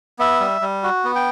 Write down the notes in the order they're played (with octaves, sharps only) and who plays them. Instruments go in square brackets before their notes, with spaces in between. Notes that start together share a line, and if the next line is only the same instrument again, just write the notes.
[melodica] B3 E5
G3
G3
F#4
B3
G5